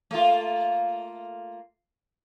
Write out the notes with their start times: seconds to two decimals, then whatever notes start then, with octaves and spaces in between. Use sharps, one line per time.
0.11 A3 A#3 F4